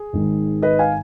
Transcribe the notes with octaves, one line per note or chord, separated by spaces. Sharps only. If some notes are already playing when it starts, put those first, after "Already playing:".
Already playing: G#4
G#1 G#2 D#3
B4 D#5
F5 G#5